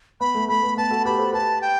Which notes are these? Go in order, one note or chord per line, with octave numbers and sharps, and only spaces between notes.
B3 B5
A3
A3 B5
B3
B3 A5
F#4 A4
G4 B4 B5
A4 C5
G4 B4 A5
G5